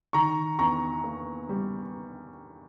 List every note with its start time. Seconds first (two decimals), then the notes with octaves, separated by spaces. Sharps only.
0.13 D#3 A#5 C#6
0.59 E2 A#5 C#6
1.04 A#3
1.49 G3